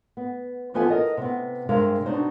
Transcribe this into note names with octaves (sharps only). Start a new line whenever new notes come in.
B3
E3 F3 B3 F4 A4 G#5
A#4 D#5
C3 B3
G2 C3 G#3 A#4 F5
B2 C4 D4 D#4 C5